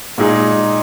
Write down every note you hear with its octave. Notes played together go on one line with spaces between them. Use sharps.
A#2 G#3 D#4 G#4